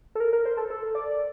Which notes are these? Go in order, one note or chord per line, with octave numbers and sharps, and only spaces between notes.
A4
A#4
A#4
C5
A4
A4
D5